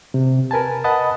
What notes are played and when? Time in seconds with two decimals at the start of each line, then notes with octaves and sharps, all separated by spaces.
0.14 C3
0.51 A#4 B4 G#5 A5
0.84 D#5 F#5 A5 B5 D#6